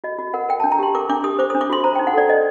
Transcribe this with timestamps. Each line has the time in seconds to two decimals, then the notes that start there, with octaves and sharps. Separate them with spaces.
0.04 F#4 D#5
0.19 F#4
0.34 A#4 F#5
0.49 A#4 G5
0.60 D4 A5
0.72 A#5
0.79 G4 C6
0.95 A#4 D6
1.09 D4 D6
1.24 G4 D#6
1.39 C5 D6
1.50 D4 D#6
1.61 D6
1.70 F#4 C6
1.84 C5 A#5
1.95 D#4 G5
2.07 F#5
2.14 A4 D5
2.29 C5 D#5